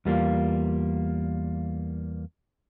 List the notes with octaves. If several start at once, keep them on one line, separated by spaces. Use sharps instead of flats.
E2 G3 A#3 F4